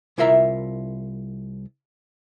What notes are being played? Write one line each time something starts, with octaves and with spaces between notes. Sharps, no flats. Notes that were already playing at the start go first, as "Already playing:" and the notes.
C2 E4 F4 A#4 E5 A#5